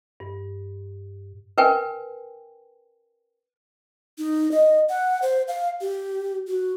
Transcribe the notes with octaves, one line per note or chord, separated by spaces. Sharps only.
G2
A#4 B4 G5 G#5
D#4
D#5
F#5
C5
F5
G4
F#4